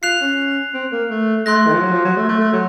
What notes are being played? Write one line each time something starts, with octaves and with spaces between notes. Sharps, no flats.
F4 F#6 C7 F7
C#4
C4
A#3
A3
A3 C6 F#6 A#6
D#3
F3
F#3
F3
F#3
A3
A3
A3
F#3